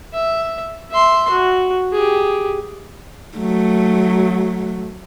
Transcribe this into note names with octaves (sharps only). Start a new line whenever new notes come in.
E5
E5 C6
F#4
G4 G#4
F#3 A3